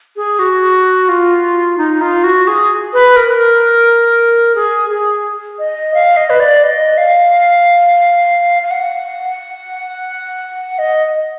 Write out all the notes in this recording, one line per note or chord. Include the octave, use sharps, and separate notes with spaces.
G#4
F#4
F4
D#4
F4
F#4
G#4
B4
A#4
G#4
G#4
D#5
F5
D#5
B4
D5
D#5
F5
F5
F#5
D#5